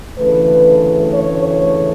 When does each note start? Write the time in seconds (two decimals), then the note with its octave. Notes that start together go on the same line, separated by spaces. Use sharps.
0.17 D2 C#3 E3 A3 B4
1.13 C#5
1.45 C#5